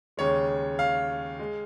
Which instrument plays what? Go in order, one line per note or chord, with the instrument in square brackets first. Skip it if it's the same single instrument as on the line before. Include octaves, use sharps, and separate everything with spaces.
[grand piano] D#2 C#3 G#3 C#5
F5
G#3